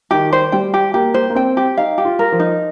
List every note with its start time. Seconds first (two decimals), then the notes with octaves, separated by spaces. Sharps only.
0.11 D#3 G4
0.33 C5
0.52 G3 G5
0.74 G4
0.94 A#3 G4
1.14 C5
1.30 A#3
1.35 C4 G5
1.57 G4
1.77 D#4 F5
1.98 G4
2.05 F4
2.19 A#4
2.32 F3
2.40 D#4